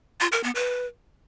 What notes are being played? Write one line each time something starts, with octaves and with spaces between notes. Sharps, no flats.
F4
A#4
B3
B4